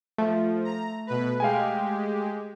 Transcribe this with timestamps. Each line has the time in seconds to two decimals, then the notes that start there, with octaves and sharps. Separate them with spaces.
0.18 F3 A3
0.64 A#5
1.07 B2 B4
1.40 G#3 G4 F5 G5 G#5